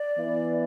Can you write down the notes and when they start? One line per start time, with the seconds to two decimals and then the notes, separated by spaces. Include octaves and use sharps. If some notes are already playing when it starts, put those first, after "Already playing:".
Already playing: D5
0.17 E3 B3 E4